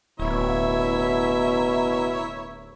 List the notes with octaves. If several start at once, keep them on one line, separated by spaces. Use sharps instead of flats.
D1 B2 E4 A#4 C#5 E5